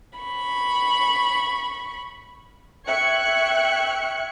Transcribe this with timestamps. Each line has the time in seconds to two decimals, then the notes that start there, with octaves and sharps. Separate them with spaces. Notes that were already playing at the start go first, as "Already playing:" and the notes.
0.19 B5 C#6
2.86 E5 G5 C#6 F#6 G#6 C#7